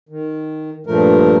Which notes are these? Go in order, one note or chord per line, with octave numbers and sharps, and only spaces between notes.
D#3
G2 A#2 F3 A3 A#4